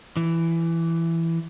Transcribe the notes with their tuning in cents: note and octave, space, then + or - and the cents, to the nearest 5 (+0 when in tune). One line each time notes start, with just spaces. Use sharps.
E3 +10